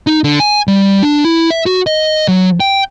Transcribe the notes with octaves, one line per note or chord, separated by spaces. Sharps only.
D#4
D3
G#5
G3
D4
E4
E5
F#4
D#5
F#3
G5